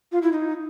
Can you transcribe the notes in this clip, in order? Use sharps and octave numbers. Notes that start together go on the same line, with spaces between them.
F4
E4
D#4